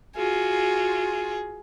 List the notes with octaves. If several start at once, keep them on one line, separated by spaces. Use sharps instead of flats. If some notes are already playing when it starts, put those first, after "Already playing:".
F4 F#4 G#4